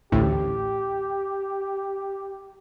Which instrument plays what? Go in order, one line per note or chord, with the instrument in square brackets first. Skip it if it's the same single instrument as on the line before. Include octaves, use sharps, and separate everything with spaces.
[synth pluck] A1 D2 A2 [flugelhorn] G4